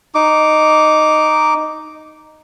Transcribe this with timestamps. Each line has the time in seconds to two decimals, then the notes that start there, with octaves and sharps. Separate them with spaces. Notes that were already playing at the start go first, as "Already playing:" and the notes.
0.15 D#4 D6